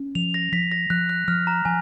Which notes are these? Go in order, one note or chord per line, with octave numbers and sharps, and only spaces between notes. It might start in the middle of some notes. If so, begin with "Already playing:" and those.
Already playing: C#4
F3 F7
A#6
F3 B6
A#6
F3 F#6
F#6
F3 F6
A#5
F3 G#5